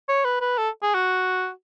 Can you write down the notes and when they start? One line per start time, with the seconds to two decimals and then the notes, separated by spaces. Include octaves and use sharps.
0.08 C#5
0.25 B4
0.41 B4
0.58 A4
0.83 G#4
0.94 F#4